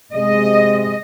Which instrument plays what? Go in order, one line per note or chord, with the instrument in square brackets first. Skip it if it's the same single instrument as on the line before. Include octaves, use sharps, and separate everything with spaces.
[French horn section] C3 G#3 [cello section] D#5